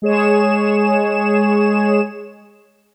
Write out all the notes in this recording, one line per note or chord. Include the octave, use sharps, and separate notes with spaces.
G#3 G#4 C#5 E7